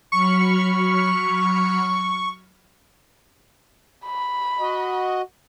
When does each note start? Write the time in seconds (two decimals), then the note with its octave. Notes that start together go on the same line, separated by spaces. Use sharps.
0.12 F#3 B5 C#6 F6
4.06 B5
4.60 F#4 D#5